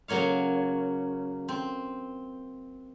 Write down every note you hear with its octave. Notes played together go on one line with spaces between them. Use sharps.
C#3 F#3 A#3 C#5 F5
C4